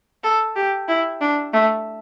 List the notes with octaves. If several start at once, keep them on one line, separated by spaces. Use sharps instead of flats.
A4
G4
E4
D4
A3